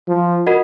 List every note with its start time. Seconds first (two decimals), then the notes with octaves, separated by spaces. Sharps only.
0.08 F3
0.46 F#4 A#4 D#5 F#5